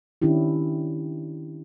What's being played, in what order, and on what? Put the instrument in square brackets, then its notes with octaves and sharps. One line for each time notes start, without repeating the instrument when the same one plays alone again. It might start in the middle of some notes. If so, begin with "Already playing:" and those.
[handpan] D#3 C#4 D4 E4 G4